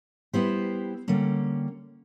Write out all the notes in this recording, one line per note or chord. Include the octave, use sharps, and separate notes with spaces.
G3 B3 E4 G4 C5
D3 G3 A#3 C#4